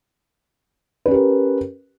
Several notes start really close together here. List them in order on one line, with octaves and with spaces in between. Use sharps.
B4 C#4 G4 A#4